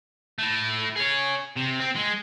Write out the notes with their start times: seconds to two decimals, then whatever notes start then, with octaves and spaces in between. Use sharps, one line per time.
0.39 A3 E4
0.96 G#4 C#5
1.57 C3
1.80 C4
1.96 G#3